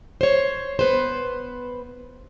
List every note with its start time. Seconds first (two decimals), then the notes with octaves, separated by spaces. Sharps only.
0.21 C5 C#5
0.79 B3 B4 C5